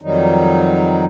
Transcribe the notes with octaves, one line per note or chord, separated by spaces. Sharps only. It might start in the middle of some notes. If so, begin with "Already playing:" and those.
F2 D#3 F#3 G3 D#4